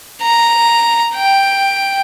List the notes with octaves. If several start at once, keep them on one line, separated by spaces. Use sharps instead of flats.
A#5
G5